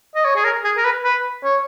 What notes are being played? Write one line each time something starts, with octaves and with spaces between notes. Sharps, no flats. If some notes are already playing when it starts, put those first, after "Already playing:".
D#5
C#5
G#4
A#4
G#4
A#4
B4
B4
C#5